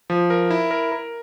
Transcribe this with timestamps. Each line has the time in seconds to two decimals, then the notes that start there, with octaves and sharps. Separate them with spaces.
0.10 F3
0.30 A#4
0.51 E4
0.71 A#4
0.92 A#4